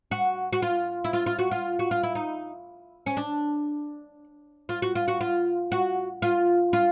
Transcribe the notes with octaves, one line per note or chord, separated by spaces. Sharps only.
F#4
F#4
F4
E4
F4
F4
F#4
F4
F#4
F4
E4
D#4
C#4
D4
F4
F#4
F4
F#4
F4
F#4
F4
F4